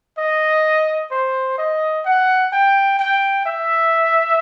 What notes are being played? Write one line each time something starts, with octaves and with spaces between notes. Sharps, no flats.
D#5
C5
D#5
F#5
G5
G5
E5